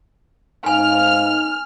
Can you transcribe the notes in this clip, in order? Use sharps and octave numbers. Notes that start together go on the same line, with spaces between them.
G#2 D#4 C5 F5 G#5 F6